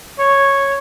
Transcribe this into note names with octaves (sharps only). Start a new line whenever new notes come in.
C#5